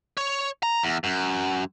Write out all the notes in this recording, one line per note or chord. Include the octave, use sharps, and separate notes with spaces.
C#5
A#5
E2
F#2